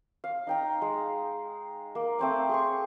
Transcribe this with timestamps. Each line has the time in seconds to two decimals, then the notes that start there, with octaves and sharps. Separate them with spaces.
0.24 F5
0.47 D#4 G5 A#5
0.82 G#3
1.95 A#3
2.19 A3 C4 D6
2.49 G#4 C6 C#6